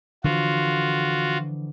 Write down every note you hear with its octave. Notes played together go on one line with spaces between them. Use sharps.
D3 E3 F3 F4 F#4